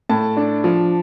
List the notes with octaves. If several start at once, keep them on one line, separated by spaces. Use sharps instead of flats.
A2 A5
D4
F3